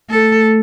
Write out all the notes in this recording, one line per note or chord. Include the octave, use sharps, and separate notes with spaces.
A3 A4